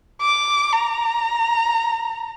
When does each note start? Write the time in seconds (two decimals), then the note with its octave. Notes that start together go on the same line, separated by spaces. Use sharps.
0.21 D6
0.73 A#5